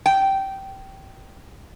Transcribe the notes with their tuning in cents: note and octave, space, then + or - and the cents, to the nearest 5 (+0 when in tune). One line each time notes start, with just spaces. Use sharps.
G5 -15